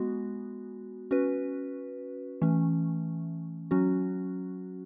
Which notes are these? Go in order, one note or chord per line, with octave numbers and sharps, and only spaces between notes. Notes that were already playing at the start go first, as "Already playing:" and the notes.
Already playing: G#3 B3 F#4
C#4 F#4 B4
E3 A3 C#4
F#3 C#4 F#4